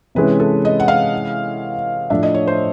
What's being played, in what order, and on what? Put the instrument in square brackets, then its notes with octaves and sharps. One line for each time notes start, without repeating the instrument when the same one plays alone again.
[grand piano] C3 E3 G#3 C#4 [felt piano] B4
[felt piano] A4
D#5
F#5
F5
[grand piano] A2 F3 A3 D4 [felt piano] E5
[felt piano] D#5
C#5
C5